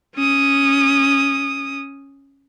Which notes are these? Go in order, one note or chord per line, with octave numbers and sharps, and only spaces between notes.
C#4 D#6